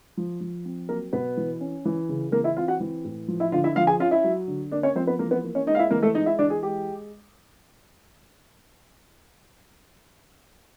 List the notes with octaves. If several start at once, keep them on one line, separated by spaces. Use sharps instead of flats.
F3
F3
C4
F#3 A#3 A#4
B2 B3 B4
E3
C#4
E3
C#3
E3 A#3 A#4
E4 E5
C4 F4 F5
F#4 F#5
E3
A2
F3
E4 E5
D3 F4 F5
E4 E5
F3 F4 F5
G#4 G#5
C#4 F4 F5
E4 E5
F#3
D3
A#3 D4 D5
C#4 C#5
F3 C4 C5
B3 B4
E3 A#3 A#4
B3 B4
A#3
C#4 C#5
G#3 D#4 D#5
F5
E4 E5
E3 A#3 A#4
A3 A4
G#3 D#4 D#5
E4 E5
E3 D4 D5
G#4
G#3 G4